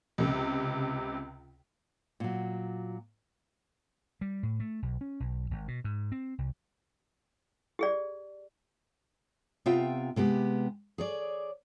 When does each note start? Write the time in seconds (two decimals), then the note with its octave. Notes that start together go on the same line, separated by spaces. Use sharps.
0.18 C#2 C3
2.20 A#2 F#3
4.21 G3
4.43 A2
4.60 A3
4.82 B1
5.01 C#4
5.20 B1
5.51 G#1
5.68 B2
5.84 G#2
6.12 C4
6.38 C2
7.79 G4 G#4 D5
9.66 C3 B3 C4 F4 E5 G5
10.16 C3 G#3 B3 G4
10.98 G#4 C#5 D5